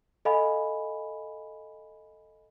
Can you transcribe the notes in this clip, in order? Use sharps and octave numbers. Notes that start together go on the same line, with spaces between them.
A4 D#5 F5 G#5 B5